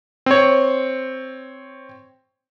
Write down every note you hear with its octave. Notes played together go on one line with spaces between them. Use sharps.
C4 C#5